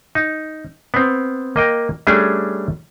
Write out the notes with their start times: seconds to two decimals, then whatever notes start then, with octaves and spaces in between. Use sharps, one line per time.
0.15 D#4
0.94 B3 C4
1.56 A#3 D#5 G5
2.07 G3 A3 C#4 D4 G#4